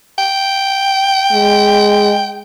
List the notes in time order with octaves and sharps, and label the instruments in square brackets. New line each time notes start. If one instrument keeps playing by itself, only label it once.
[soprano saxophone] G5
[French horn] G#3